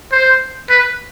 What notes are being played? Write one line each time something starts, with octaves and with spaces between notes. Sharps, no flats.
C5
B4